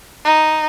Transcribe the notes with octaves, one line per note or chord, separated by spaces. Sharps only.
D#4